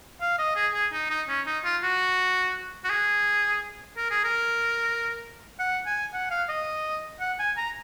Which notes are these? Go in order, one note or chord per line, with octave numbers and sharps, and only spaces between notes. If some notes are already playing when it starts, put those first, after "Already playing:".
F5
D#5
G#4
G#4
D#4
D#4
C#4
D#4
F4
F#4
F#4
G#4
A#4
G#4
A#4
F#5
G#5
F#5
F5
D#5
F#5
G#5
A#5